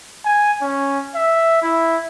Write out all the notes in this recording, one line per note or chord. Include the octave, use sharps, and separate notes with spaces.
G#5
C#4
E5
E4